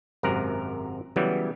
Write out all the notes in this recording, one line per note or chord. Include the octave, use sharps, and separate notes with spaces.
G#1 F#2 C3 A#4 F#5
C#3 E3 F#3 G3 B3